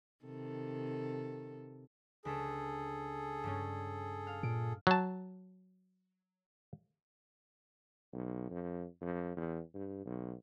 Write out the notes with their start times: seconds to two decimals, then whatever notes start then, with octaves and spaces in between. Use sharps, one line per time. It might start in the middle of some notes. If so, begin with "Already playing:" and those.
0.25 C3 D#3 A4
2.25 C#2 D4 G#4 A4 B6
3.44 G2 G3 C#4
4.27 F5
4.43 A#2 D7
4.87 F#3 A5
8.13 B1
8.50 F2
9.01 F2
9.37 E2
9.75 G2
10.06 B1